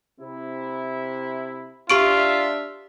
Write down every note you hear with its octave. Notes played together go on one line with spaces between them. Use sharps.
C3 E4
D4 F4 G4 E5 C#6 D7